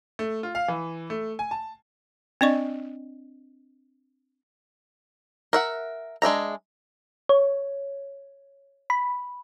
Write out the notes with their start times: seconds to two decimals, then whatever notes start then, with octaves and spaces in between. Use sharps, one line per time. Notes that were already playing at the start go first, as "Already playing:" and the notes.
0.19 A3
0.43 F4
0.55 F5
0.68 E3
1.10 A3
1.39 G#5
1.51 A5
2.41 C4 D4 D5 D#5 C#6
5.53 A#4 E5 F#5
6.22 G#3 D4 E5 A#5
7.29 C#5
8.90 B5